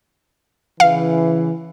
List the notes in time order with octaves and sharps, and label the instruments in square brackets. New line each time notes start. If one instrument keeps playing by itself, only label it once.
[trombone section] C#3 E3 [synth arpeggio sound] F5